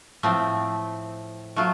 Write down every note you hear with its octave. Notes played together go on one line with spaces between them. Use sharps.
A2 F3 A3 C4
F#3 A3 F4